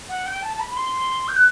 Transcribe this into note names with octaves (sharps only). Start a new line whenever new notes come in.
F#5
G5
A5
A5
B5
B5
C6
G6
F#6